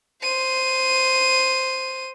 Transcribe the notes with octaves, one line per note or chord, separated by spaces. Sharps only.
C5 D#7